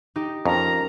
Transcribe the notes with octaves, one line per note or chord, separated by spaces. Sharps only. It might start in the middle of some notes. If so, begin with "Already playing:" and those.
D#4 G4
F2 C#4 A#4 A#5